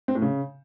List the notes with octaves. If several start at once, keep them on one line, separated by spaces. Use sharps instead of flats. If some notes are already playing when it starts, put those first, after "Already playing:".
C4
A2
C#3